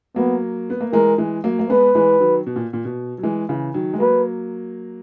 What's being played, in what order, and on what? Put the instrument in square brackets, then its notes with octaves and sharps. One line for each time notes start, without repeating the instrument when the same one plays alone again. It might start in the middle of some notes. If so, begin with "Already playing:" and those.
[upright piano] F#3 A#3 [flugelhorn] B3
[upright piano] B3
A#3
[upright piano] E3 G#3 [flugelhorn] A#4
[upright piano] E3 G#3
F#3 A#3
A#3
[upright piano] G#3 B3 [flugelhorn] B4
[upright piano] E3 G#3
D#3 F#3
B2
A#2
A#2
B2
F#3
E3 G#3
C#3 E3
D#3 F#3
G#3
[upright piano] F#3 A#3 [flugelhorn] B4